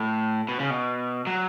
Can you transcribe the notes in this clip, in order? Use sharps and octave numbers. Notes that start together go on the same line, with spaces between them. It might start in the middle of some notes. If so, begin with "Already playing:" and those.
Already playing: A2
B2
C#3
B2
F#3